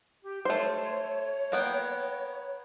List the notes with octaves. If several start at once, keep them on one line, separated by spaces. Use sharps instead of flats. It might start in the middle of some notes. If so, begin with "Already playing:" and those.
G4
A3 C5 C#5
A#3 B3 G5